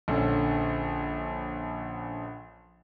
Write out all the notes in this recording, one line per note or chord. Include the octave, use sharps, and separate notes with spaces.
A#1 D3 C#4